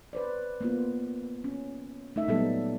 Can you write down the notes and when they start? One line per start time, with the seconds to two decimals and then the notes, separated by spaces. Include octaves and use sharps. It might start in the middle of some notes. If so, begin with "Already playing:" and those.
0.13 B4 C5 D5
0.61 A#3 B3 F4
1.44 C#4
2.16 A3 D#4 E5
2.28 A#2 F#3 G3 B3 D#4 A4